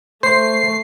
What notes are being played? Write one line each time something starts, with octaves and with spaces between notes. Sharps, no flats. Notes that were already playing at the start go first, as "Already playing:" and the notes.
A3 C5 C7